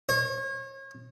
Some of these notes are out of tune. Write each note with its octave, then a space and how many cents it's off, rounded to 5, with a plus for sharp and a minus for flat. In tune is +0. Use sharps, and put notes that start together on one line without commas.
C#5 -35